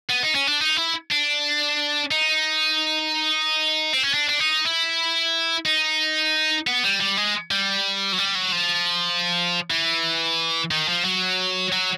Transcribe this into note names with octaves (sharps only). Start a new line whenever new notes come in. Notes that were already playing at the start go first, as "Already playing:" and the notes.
B3
D#4
C#4
D4
D#4
E4
D4
D#4
C4
C#4
D4
D4
D#4
E4
D#4
B3
G3
G3
G#3
G3
F#3
G3
F#3
F3
E3
D#3
F3
F#3
F#3